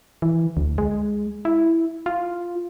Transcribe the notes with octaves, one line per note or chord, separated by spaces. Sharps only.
E3
D2
G#3
E4
F4